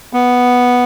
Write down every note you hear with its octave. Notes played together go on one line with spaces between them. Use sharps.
B3